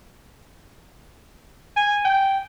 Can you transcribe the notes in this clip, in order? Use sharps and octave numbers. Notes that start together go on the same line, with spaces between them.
G#5
G5